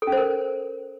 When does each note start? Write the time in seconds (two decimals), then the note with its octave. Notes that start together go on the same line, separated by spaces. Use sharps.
0.02 A4
0.07 C#4
0.12 C5
0.17 A#4